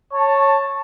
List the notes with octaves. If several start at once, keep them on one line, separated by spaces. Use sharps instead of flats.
C#5 A5